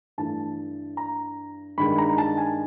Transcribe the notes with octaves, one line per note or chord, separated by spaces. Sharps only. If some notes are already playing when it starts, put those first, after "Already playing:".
G2 E3 A3 A5
A#5
G2 D#3 G#3 B5
A#5
A5
G#5